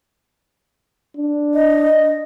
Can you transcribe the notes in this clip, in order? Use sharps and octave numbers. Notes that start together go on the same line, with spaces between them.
D4
D#5